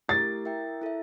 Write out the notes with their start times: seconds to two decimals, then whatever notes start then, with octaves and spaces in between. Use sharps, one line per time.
0.08 A3 E4 G4 A#4 A6
0.45 E4 A#4 E5 G5
0.82 E4 A4 E5